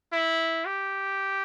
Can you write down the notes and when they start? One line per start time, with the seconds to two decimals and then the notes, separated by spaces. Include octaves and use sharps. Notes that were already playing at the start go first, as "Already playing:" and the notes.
0.12 E4
0.65 G4